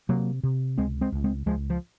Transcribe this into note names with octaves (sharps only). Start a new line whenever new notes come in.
C3 F#3 A#3
C3
C#2 G#3 C4
G#3 C4
C#2
G#3 C4
C#2 F3 G#3
F3